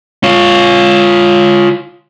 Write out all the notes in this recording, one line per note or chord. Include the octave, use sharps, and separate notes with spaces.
F4 C#5